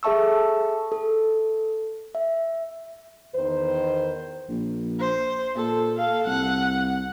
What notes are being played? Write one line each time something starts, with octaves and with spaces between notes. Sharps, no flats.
G#4 A4 E5 A5 C#6 E6
A4
E5
E2 D#3 B4 C5
A#1
C5
A#2 A4
A4 F5
C2 F#5